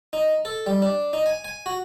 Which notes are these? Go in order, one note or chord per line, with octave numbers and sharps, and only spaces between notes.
D#4
A4
G3
D4
D#4
G#5
G#5
F#4